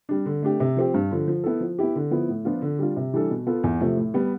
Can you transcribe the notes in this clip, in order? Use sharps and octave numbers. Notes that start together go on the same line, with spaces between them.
G3 D4
D3
A3 D4 G4
C3
F3 C4 G4
G2
D3 F3
F3
B3 E4 A4
F3
B3 E4 G4
D3
F3 B3 E4
A2
F3 B3 D4 F4
D3
G3 D4 F4
C3
E3 G3 D4 A4
B2
B3 F4 A4
E2
C3 F3 A3
A2
G3 B3